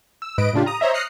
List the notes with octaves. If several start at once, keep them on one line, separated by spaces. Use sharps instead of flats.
E6
G#2 B4 D#5 D7
A2 C#3 D4 F4 G4
A#5 D#6
C5 C#5 D#5 E5 A#5
D#6 F6 F#6 A#6 C7 C#7